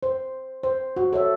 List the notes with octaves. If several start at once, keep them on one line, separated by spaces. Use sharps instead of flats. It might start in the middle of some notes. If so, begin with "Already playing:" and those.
C5
C5
F#4
A4 C#5 E5